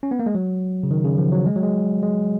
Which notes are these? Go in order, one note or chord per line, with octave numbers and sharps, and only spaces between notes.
C#4
B3
A#3
G#3
F#3
C#3
D#3
C#3
F3
F#3
G#3
F#3
G#3
G#3